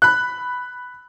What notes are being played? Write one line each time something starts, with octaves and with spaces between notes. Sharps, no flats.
B5 F#6